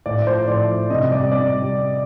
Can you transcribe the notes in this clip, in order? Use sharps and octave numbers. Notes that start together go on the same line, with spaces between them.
A2 D5
F3 C5
A2 D5
F3
C3 D#5
G3 D5
C3 D5
G3